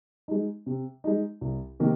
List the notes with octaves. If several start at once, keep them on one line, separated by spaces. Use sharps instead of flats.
G#3 D#4
C3
G#3 D#4
C2
C3 D#3 A#3